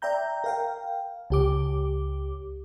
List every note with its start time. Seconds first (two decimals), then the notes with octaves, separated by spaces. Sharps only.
0.02 D5 E5 G5 A#5 G6
0.44 A#4 F5 G5
1.30 C#2 G4 D6